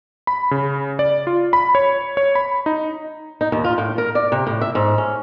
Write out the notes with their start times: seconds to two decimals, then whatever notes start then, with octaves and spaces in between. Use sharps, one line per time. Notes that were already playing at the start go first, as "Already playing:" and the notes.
0.27 B5
0.51 C#3
0.99 D5
1.27 F4
1.53 B5
1.75 C#5
2.17 C#5
2.35 B5
2.66 D#4
3.41 D#4
3.52 D#2
3.64 F4
3.78 A2
3.98 A#4
4.15 D5
4.32 C3
4.47 A2
4.61 E5
4.75 G#2
4.98 C#4